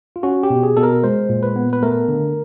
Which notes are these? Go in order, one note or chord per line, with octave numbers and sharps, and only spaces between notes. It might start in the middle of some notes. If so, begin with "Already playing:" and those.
F4
C#4 F#4
G4
B2
G#4
B2 A4
A#4
G#3 C5
A#2
B4
B3
B4
A3 A#4
D3